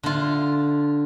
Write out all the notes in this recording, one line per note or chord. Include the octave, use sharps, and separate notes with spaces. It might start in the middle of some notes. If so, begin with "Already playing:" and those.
D3 F4